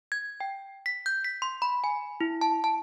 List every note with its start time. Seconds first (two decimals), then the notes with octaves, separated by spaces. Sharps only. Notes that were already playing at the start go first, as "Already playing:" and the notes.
0.12 G#6
0.40 G5
0.86 B6
1.06 G6
1.24 B6
1.42 C6
1.62 B5
1.84 G#5
2.21 E4
2.41 A5
2.64 A5